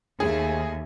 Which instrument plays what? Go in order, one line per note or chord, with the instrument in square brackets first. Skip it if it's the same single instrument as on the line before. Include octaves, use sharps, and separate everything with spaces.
[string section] D#2 [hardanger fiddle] A3 G#5 [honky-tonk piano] G#4